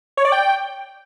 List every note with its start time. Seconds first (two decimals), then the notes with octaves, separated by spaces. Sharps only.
0.17 C#5
0.25 D5
0.32 G5